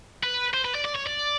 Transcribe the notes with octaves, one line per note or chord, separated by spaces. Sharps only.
B4
C5
B4
D5
D5
C#5
D5